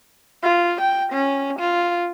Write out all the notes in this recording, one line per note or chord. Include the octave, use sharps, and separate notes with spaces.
F4
G5
C#4
F4